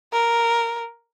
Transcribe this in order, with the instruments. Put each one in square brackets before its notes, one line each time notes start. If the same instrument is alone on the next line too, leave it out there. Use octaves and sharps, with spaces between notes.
[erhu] A#4